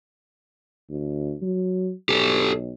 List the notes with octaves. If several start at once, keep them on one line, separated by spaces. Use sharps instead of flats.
D2
F#3
B1 G4 A4